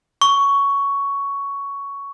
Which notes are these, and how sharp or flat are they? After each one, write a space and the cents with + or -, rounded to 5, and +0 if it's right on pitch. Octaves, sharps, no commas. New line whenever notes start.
C#6 +10